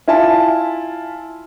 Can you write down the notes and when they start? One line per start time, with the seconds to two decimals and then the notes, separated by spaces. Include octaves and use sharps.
0.08 E4 F4 E5 G#5 A5